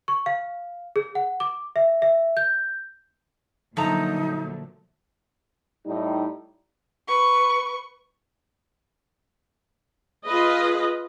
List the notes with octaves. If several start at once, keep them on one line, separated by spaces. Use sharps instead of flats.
C#6
F5
G#4
F#5
D6
E5
E5
G6
A#2 D3 F3 F#3 A3 D#4 A#5
A2 G3 D#4
B4 C#6
F4 G#4 B4 D#5